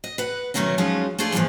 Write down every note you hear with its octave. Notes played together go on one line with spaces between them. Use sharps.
D#5
B4 F#5
B2 D#3 F#3 A3 C#4 D#4
F3 F#3 G#3 C#4 D#4 F4
A3 D4 F4 G#4 A4
E2 G2 A#2 D3 E3 F3